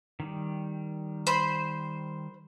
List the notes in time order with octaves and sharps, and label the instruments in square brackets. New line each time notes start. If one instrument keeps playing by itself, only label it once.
[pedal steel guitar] D#3 G3
[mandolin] C5 B5